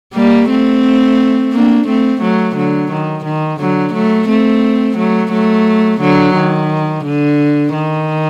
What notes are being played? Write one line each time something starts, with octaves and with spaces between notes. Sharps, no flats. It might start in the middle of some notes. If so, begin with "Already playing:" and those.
G3 A#3
A3 C4
A#3 D4
A3 C4
F#3 A3
D3 F#3
D#3
D#3
D3 F#3
F#3 A3
A3 C4
F#3 A3
F#3 A3
D3 F#3
D#3
D3
D#3